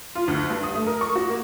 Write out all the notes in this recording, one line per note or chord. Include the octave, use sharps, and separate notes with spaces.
F4
D2
G2
D#6
A3
A#4
C#6
F#4
A#3